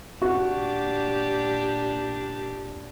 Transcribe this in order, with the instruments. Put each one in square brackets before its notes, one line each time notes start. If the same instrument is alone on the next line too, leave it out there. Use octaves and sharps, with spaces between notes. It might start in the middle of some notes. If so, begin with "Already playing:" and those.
[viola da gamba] A#2 D4 G4 [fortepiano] F#4